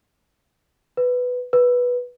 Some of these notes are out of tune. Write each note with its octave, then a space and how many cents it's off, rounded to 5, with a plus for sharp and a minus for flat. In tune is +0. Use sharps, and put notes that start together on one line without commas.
B4 +5
B4 -10